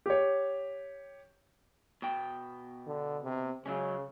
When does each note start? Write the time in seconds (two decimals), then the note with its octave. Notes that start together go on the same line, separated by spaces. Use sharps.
0.06 G4 C#5
2.02 B2 G5
2.87 D3
3.24 C3
3.66 C#3 F#3 G#3 C#4